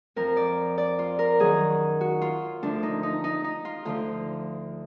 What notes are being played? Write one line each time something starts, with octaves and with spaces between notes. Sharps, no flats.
F2 F3 A#4
D5
D5
F4
A#4
F#2 D#3 F#3 G#4
F#4
F4
D2 D3 F3 D4
D#4
D#4
D#4
D#4
F4
D2 D3 F3 F4